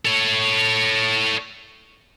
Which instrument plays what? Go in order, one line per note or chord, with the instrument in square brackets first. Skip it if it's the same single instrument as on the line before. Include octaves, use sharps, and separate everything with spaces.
[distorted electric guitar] A4 C#5